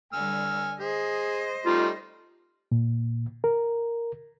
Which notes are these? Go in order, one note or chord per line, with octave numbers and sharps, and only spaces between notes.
D3 G3 G#5 E6 F6
G#4 C5 D#5
G3 A3 D#4 F4
A#2
A#4